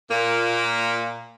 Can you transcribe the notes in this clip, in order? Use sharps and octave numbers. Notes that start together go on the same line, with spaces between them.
A#2 A#3